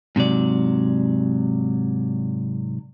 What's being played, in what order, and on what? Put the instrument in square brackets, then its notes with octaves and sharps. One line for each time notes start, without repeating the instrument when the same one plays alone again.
[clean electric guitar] G#2 C3 F#3 D5